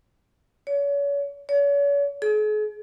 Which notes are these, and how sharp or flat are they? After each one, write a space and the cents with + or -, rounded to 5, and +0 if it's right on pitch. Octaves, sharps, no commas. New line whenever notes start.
C#5 +35
C#5 +40
G#4 +40